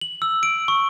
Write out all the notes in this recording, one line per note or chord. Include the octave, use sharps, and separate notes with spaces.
F#7
E6
D7
C#6